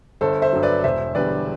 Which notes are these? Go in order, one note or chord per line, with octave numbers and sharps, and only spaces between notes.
G1 A4 C5
C5 E5
G2 F#3
B4 D5
E1 C5 E5
E2 D3 G3 B4 D5